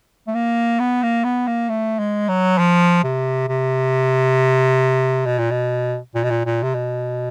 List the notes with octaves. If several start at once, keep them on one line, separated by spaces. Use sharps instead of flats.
A3
A#3
B3
A#3
B3
A#3
A3
G#3
F#3
F3
C3
C3
B2
A#2
B2
A#2
B2
A#2
A#2
C3
B2